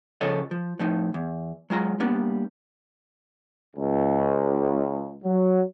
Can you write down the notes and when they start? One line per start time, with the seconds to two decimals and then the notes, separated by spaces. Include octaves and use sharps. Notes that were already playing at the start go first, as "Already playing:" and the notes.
0.21 C#3 F3 A4 C#5 D#5
0.51 F3
0.79 A2 F3 D#4
1.14 E2
1.70 F#3 G#3 F4 A#5
2.00 G3 A#3 B3 D4
3.76 C#2
5.24 F#3